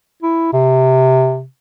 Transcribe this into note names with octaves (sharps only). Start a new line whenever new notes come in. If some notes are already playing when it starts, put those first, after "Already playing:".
E4
C3